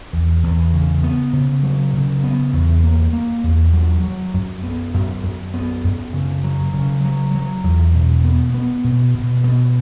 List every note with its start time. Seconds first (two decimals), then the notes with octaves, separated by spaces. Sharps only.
0.13 E2
0.44 E2
0.74 C#3
1.03 B3
1.33 C#3
1.63 F#3
1.93 C#3
2.24 B3
2.53 E2
2.84 A#3
3.13 A#3
3.44 E2
3.74 F#3
4.04 F#3
4.34 F#2
4.63 B3
4.94 F#2
5.23 F#2
5.54 B3
5.84 F#2
6.13 C#3
6.44 F#3
6.74 C#3
7.04 F#3
7.35 F#3
7.64 E2
7.94 B2
8.25 B3
8.54 B3
8.84 B2
9.14 B2
9.44 B2